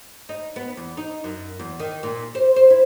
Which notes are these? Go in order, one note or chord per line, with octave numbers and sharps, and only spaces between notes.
D#4
B3
E2
D#4
F#2
E2
D#3
A#2
C5
C5
E4